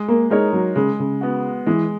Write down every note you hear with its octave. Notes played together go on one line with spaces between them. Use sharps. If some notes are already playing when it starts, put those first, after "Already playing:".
Already playing: G#3
A#3
G#3 D#4 A#4 C#5
F#3
C#3 G#3
C#3
B3 F#4
E3 G#3